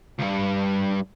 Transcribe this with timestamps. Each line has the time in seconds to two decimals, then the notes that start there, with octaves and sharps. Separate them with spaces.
0.19 C#2 G2